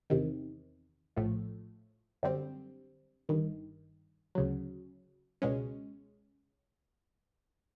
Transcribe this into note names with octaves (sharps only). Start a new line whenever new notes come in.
E2 C3 D#3
A#1 A2 F3 A3
F#2 D3 G3 C4
G1 G2 D#3
D2 C#3 F#3
C#2 B2 G#3 C#4